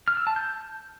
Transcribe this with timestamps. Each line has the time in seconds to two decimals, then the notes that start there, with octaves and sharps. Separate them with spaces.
0.08 F6
0.17 E6
0.27 A5
0.36 G6